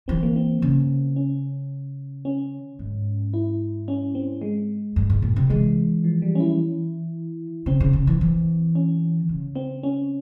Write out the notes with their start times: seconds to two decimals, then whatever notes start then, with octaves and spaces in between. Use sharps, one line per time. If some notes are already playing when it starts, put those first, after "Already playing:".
0.08 E3 C4
0.23 A#3
0.36 C4
0.62 C#3
1.16 C#4
2.25 C#4
2.79 G#2
3.34 E4
3.88 C#4
4.15 C4
4.41 G#3
4.96 G2
5.10 G#2
5.22 A#2
5.36 C3
5.50 E3 G#3
6.04 F3
6.22 G3
6.35 C#4
6.40 E4
7.66 C#3 C4
7.80 C#3
7.93 C#3
8.07 E3
8.21 E3
8.75 C#4
9.29 C#3
9.55 C4
9.83 C#4